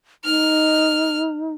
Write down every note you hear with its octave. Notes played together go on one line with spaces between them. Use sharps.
D#4 F6